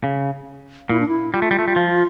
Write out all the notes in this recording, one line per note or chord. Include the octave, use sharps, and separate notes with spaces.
C#3
A#2 E4
D4
E4
G3 F4
A3
G3
A3
G3
F3